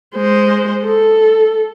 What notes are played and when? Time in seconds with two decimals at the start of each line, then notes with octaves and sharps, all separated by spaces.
0.16 G#3 C5
0.85 A4